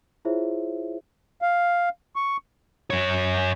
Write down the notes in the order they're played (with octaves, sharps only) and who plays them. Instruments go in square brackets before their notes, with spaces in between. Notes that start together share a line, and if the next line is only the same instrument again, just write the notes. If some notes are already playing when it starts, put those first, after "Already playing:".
[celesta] E4 F4 G#4 C5 C#5 E5
[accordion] F5
C#6
[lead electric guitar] F#2 C#5